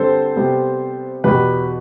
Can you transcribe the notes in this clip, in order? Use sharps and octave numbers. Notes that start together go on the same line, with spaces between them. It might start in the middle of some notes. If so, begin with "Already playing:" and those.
Already playing: G2 D3 G3 C4 A4 C5
C3 G3 B3
E2 B2 B3 G4 B4